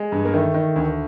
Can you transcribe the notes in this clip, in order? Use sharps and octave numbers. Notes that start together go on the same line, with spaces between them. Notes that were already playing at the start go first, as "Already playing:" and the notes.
Already playing: G#3
G2
A#3
D#3 A3
D#3
D2